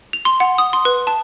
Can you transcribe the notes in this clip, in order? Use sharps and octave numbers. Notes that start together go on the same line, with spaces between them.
F7
C6
F#5
D#6
C6
B4
A5